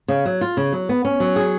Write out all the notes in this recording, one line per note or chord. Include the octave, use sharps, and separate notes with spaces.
C#3
F#3
F4
C#3
F#3
B3
C#4
F#3
G#4